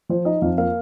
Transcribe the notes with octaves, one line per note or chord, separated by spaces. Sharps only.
F3 C5
D#4 D#5
F2 F5
A#3 F5